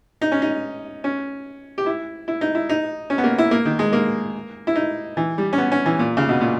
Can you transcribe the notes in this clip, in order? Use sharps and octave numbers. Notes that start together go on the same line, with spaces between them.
D#4
C#4
D#4
C#4
G4
E4
E4
D#4
E4
D#4
C#4
B3
A#3
E4
A#3
D#3
G#3
A#3
E4
D#4
E3
G3
C#4
B3
C#4
E3
A#2
C#3
B2
A#2